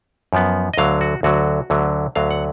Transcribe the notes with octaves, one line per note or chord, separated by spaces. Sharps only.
F#2 F3 B3
D#5
D2 D3 F#3 F5
F#4
D2 D3 F#3 F#4
D2 D3 F#3
D2 D3 F#3 F5
F#5